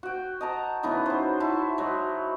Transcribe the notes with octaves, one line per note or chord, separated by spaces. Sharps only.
F#4 G5
D#5 A5 A#5
C#3 E3 B3 D#4
F#3 C5
E4 F#4 A5
F#3 G#3